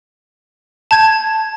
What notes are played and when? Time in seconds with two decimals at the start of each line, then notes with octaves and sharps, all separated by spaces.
0.91 A5 G6 G#6